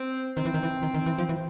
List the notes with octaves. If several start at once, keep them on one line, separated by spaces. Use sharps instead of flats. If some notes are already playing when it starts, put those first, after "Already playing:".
Already playing: C4
D#3 C4
E3
D#3
E3
D#3
D#3
E3
F3
E3